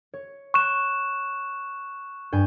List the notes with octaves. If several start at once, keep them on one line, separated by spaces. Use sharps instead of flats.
C#5
C#6 F#6 E7
G2 G#5 G6